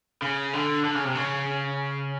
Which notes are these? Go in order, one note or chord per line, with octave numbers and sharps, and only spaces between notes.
C#3
D3
D3
C#3
C3
C#3